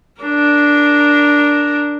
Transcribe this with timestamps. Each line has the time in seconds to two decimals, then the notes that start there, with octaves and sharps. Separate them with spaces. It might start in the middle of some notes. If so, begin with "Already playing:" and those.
0.22 D4 A#4